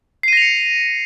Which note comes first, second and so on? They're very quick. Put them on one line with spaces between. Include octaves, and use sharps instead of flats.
C7 D#7 A#6 F7 C#7